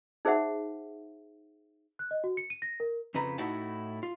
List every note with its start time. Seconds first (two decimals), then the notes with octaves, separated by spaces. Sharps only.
0.25 D#4 G#4 C5 E5 F#5
1.99 F#6
2.11 D#5
2.24 F#4
2.37 C#7
2.50 D#7
2.62 A#6
2.80 A#4
3.14 F2 C#3 F3 B4 A#5
3.38 A2 D#4 E4 F#4 F#5 A5
4.03 F4